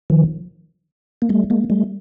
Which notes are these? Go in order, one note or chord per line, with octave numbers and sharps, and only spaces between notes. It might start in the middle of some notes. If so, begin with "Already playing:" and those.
D#3 F3
A#3
G3 A3
G#3 A#3
G3 A3